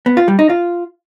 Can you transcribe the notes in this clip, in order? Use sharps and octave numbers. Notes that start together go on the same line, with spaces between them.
B3
F4
G3
D#4
F4